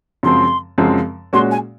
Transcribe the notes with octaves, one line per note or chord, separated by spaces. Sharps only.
F#2 C#3 F3 G#3 C4 C6
F#2 C#3 F3 G#3 C4
A#2 G#3 C#4 F#4 C6
G#5